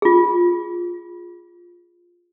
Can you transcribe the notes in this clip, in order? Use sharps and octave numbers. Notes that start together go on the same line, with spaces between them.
F4 G#4